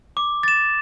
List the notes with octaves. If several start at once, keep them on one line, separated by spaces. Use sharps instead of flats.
D6
A6 E7